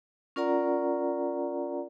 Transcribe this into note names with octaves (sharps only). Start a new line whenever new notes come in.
C#4 F4 A#4 D5 F#5 A#5